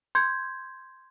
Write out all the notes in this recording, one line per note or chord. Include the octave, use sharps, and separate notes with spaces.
C6 G6 G#6